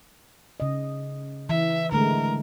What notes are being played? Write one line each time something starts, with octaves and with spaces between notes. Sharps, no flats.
C#3 D#5
E3 E5
D3 G#3 A3 A#4